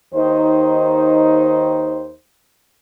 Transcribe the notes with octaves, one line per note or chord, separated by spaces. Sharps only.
D#2 D#3 D#4 C5